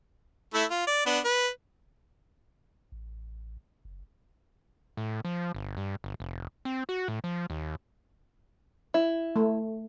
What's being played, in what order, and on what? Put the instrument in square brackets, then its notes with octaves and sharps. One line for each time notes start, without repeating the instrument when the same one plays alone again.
[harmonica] A3 E4
F4
D5
B3 D4
B4
[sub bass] A1
F#1
[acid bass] A2
F3
G1
G2
G1
F1
C4
F#4
A2
F3
D#2
[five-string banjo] E4
[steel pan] A3